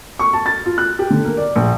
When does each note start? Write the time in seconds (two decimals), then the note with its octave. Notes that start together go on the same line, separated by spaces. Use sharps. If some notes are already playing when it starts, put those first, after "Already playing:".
0.19 C#6
0.33 A5
0.46 A6
0.66 F4
0.78 F#6
0.99 G4
1.10 D3
1.25 A#3
1.37 D5
1.56 A#1